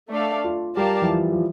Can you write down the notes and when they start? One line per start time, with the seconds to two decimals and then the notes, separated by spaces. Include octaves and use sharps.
0.11 A3 D4 A4 D5 F5
0.44 F4
0.76 G3 G4 A#4 D5 F5 A5
1.02 E3
1.09 F3
1.32 F3